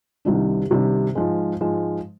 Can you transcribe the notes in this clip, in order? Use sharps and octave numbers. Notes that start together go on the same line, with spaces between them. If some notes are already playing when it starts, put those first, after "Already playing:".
C2 C3 D#3 G3 D4
C2 C3 D#3 G3 D4
G#2 F3 G#3
G#2 F3 G#3